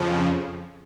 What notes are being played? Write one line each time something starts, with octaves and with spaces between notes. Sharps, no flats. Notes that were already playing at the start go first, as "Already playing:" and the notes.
Already playing: F2 C#3 F3